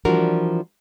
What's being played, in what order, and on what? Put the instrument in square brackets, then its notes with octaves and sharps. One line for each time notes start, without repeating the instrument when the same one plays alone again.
[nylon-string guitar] E3 F3 G3 D4 F#4 A#4